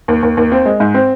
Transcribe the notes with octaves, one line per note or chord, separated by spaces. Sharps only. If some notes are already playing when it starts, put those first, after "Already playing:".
D#2
D#2
D#2
C4
G#3
G#2
C4